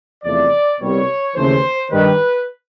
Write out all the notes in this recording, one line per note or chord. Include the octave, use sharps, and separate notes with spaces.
E2 C3 F3 A3 D5
C2 B2 G3 C#5
D#2 C#3 E3 A3 C#4 C5
G2 D#3 G3 B4